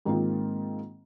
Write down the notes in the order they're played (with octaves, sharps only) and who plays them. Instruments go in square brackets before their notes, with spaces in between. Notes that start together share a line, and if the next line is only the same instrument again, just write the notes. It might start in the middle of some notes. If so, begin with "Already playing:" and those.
[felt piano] G#2 D#3 A#3 C4 D#4 F4